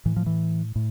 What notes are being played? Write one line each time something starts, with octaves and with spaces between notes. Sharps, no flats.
A2 E3
F3
E3
A2